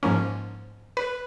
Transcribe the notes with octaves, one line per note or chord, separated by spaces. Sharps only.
G#2 F3 A#3 C#4
B4